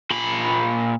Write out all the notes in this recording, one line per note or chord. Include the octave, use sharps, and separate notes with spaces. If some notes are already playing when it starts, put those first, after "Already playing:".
A#2 B5